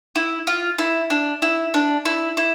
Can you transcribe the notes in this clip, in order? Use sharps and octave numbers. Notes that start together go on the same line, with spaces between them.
E4
F4
E4
D4
E4
D4
E4
E4